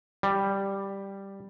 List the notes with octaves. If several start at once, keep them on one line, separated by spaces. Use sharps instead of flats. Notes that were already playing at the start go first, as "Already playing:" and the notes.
G3